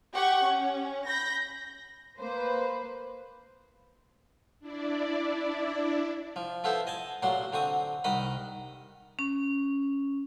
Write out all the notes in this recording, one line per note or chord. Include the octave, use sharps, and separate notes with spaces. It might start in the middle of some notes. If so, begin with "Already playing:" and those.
G4 F#5 C#6
C#4
B5 G6 A#6
A#3 B4 C5
D4 E4 D5
F3
F3 B3 E4 A4 C5
D#5 G#5 A5
A1 A#2 F#3 F#5 C6
D3 C4 C#6 D#6
C2 D#3 D#5 F#5 B5
C#4